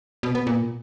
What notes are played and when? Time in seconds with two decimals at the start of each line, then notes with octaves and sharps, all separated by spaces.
0.23 B2
0.35 B3
0.47 A#2